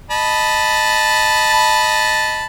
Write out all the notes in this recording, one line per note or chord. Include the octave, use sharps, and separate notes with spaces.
D#5 A5 B5